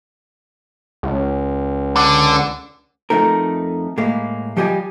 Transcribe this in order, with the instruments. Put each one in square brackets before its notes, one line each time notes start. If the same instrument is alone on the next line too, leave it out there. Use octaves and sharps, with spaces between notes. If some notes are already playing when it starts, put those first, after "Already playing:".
[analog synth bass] C#2
[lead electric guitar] D3
[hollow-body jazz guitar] F2 A3 D#4 A#4
A2 G#3 A#3
F3 G3 G4 D#5 G#5